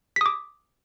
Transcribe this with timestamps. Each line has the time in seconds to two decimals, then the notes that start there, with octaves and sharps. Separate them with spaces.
0.16 B6
0.21 D#6
0.26 D6